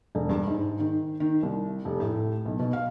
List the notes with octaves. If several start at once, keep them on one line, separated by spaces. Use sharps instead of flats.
E1
G2
G#2
D#3
D#3
C2
F1
A2
B1
B2
F5